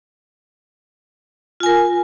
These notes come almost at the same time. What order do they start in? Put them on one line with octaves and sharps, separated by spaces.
F4 G#5 A#4